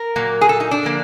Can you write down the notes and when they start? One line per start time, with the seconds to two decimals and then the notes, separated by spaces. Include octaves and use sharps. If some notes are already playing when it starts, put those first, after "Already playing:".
Already playing: A#4
0.16 A#2 F#3 A#3
0.41 G#4
0.49 A4
0.60 D#4
0.71 D4
0.83 D3 F3 A#3